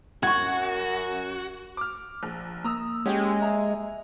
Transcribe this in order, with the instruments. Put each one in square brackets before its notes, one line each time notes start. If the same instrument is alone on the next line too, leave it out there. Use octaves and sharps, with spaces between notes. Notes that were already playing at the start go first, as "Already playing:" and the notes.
[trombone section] F#2 [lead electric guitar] F#4 [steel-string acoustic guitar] F#5 [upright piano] C#6 G#6
[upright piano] D6 F6
A#1
[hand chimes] A#3 [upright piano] A#5 D#6 E6
[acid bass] G#3 [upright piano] C#4 G4
[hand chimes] E5 [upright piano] A#5